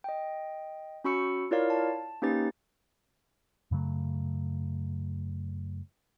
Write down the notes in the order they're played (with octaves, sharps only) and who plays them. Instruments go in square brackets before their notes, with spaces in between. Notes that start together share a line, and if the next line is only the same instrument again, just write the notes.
[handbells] D#5 G5
C#4 F#4 B5 C#6 E6 C#7
E4 F4 A#4 C#5 D5 F5
A5
A#3 C#4 D#4 G4 B4 A6
[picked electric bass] F#2 C#3 F#3 A3